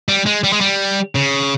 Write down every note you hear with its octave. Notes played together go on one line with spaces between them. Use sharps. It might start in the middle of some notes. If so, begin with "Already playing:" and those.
G3
G#3
G3
G#3
G3
C#3